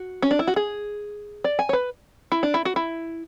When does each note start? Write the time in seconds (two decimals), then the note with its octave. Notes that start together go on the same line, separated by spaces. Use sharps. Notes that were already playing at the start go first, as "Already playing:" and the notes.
Already playing: F#4
0.22 C#4
0.31 D4
0.39 E4
0.47 F#4
0.56 G#4
1.44 D5
1.59 G#5
1.69 C#5
1.73 B4
2.32 E4
2.43 D4
2.54 E4
2.65 F#4
2.76 E4